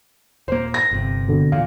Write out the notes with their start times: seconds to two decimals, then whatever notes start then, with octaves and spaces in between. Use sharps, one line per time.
0.48 D#1 A#3 C5
0.74 A#6
0.91 G1 C3
1.28 B2 D3
1.52 E2 A#2 F5